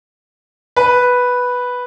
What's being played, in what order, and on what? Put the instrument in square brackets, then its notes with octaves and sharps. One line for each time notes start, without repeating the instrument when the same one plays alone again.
[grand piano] B4